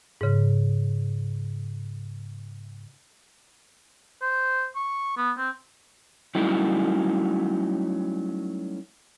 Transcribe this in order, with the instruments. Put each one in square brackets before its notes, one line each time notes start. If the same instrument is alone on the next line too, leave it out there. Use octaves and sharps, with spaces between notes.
[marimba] G#2 C#3
[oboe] C5
C#6
B3
C4
[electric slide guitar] F#3 G3 A3 C#4 D#4 E4